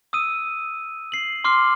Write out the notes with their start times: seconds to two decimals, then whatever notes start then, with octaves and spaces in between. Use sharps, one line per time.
0.13 D#6 E6 D#7
1.12 C7 F#7
1.44 C6 D6 F6 C7